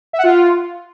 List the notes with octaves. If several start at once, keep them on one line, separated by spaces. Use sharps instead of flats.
E5
F#5
F4